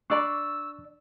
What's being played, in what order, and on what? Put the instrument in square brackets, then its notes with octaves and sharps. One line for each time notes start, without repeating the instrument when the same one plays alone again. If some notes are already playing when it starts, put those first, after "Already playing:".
[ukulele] D4 D5 B5 [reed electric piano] C#6 [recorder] E6